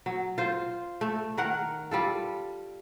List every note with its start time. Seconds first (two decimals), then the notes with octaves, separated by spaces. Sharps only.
0.06 F#3
0.38 F4 C5
1.01 A3
1.38 D#3 A#4 F#5
1.91 G3 F4 A4